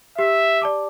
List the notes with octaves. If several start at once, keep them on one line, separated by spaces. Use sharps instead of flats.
G4 E5
D5 A5 D6